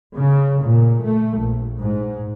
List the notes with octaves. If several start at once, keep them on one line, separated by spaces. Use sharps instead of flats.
C#3
A#2
A3
A#1
G#2